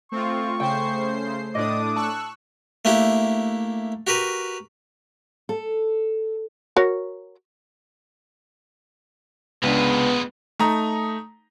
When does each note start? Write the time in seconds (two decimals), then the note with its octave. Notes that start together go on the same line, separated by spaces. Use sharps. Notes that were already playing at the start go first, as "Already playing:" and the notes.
0.12 A3 C4 F4 C#6
0.60 C#3 C5 G5 C7
1.55 A2 D4 D5 D#5 D6 D#6
1.96 A5 C#6 E6 F#6
2.85 A3 A#3 D4 E4 G4
4.07 F#4 G4 A#4 B4
5.49 A4
6.76 F#4 A#4 C#5
9.63 C#2 G#3 B3 D4 B4
10.59 A3 D#4 A#5 D#6